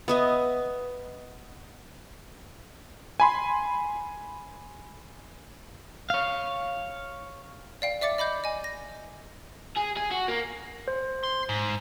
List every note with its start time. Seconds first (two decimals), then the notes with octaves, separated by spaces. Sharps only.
0.08 B3 D#5 E5
3.20 G#5 B5 C6
6.10 C#5 F5
7.82 D5 F5 G5
8.01 D5 E5 D6 A6 C#7
8.18 D#5 B5 D6 G6
8.44 D#5 G#5
8.64 A#6
9.77 G#4
9.97 G#4
10.11 F#4
10.28 A#3
10.88 C5
11.24 C6
11.49 G#2